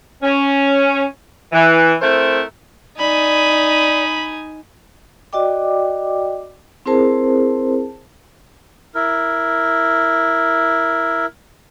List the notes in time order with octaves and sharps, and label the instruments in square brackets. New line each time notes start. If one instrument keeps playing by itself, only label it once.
[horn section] C#4
E3
A3 C4 E4 A#4 C5
[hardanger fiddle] D#4 G#5 [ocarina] D5 [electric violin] B5
[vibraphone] F#4 D5 D#5 G5 D6
C4 E4 G#4 A#4 C5 A5
[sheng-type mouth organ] E4 A#4